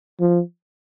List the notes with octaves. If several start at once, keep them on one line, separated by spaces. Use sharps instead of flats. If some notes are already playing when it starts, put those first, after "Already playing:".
F3